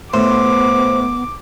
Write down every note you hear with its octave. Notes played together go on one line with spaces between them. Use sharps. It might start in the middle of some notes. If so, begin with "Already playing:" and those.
A2 B3 C5 D6